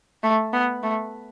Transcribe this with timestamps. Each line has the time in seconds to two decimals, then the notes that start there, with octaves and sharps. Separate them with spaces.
0.23 A3
0.53 B3
0.83 A3